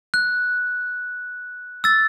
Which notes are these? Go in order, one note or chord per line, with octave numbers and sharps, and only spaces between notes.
F#6
E6 A6